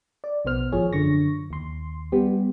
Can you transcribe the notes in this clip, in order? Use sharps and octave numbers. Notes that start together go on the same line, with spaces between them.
D5
A#1 B2 B3 C5 F6
G#1 F3 G#4 C#5
F#2 D3 C#6 A#6
D#2 C6
G3 B3 G4